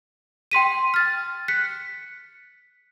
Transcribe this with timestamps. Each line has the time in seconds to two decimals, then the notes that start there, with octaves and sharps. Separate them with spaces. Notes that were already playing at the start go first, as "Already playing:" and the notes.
0.51 G5 C6 B6 D#7
0.94 F6 A6
1.48 F#6 B6 C#7